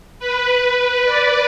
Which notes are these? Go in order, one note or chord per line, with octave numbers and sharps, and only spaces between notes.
B4
D5